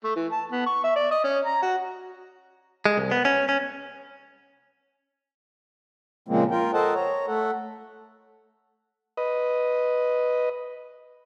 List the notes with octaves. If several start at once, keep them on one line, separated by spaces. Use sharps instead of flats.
A3
E3
A5
B3
C#6
E5
D5
D#5
C#4
A#5
F#4
G#3
C2
B3
C#4
C#4
A#2 C#3 F3 G#3 A#3 C4
F4 A#4 G5
A4 A#4 C5 D#5 F#5 A5
C#5 A#5
A3 A4 F#5
B4 D#5